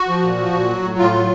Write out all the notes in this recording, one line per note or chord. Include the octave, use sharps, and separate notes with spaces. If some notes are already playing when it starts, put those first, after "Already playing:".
Already playing: F#4
F3
A#2
F3
A#2
F#3
A2
A2 F4
F#3